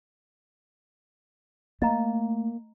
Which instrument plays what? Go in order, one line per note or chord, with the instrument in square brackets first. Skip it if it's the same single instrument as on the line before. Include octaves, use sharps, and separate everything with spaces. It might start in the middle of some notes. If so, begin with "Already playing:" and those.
[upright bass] A3 [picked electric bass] A#3 [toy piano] D#5 A#5